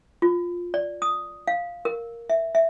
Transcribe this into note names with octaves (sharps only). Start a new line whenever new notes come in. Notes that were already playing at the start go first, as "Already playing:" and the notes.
F4
D5
D#6
F5
A#4
E5
E5